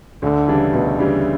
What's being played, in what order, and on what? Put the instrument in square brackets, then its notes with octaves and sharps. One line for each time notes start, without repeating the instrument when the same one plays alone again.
[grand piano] D2 [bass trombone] D3
[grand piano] C#3 E3 G3 D4
[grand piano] D2 [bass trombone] B2
[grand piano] C#3 E3 G3 D4